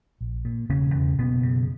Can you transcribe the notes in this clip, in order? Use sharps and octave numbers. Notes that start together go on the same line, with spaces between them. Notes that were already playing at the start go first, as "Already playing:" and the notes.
A#1
A#2
E1 C#3 C#4
E2 B2
F#1 B2 B3
F#2 C#3